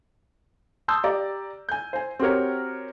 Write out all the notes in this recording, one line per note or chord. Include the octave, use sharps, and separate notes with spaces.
A5 C6 D#6 E6 G6
G4 D5 A#5
G#5 G6
C5 G#5
C4 F#4 G4 A#4 C#5